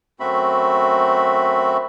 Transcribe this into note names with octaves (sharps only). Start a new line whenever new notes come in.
F#2 A3 C4 F#4 E5 B5